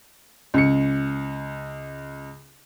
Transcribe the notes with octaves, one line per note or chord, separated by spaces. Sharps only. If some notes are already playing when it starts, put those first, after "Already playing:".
C#2 C#7